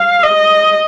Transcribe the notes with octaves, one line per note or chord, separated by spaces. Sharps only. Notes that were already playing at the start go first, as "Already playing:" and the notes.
Already playing: F5
D#5